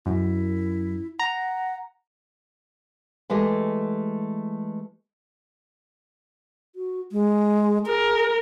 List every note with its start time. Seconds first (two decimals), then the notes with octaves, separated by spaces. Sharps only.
0.06 F#2 E4
1.19 F#5 A#5
3.30 E3 G#3 A3 G4 D#5
6.76 F#4
7.12 G#3
7.86 G#4 A#4